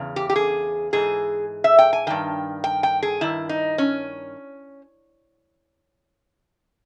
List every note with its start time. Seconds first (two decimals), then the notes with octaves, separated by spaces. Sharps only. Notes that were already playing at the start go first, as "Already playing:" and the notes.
Already playing: E2 C#3
0.16 G4
0.30 G4
0.36 G#4
0.93 G#2 E3 G#4
1.64 E5
1.79 G5
1.93 G#5
2.07 G2 D#3 G5
2.64 G5
2.83 G5
3.03 G#4
3.21 G2 D#3 E4
3.49 D#4
3.78 C#4